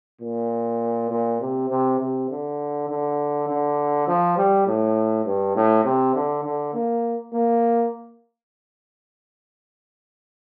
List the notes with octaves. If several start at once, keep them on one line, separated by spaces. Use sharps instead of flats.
A#2
A#2
C3
C3
C3
D3
D3
D3
F3
G3
A2
G2
A2
C3
D3
D3
A#3
A#3